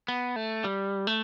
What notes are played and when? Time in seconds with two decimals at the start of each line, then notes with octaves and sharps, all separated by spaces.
0.08 B3
0.36 A3
0.64 G3
1.07 A3